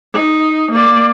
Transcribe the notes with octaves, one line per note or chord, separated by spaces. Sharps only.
D#4
A#3 D5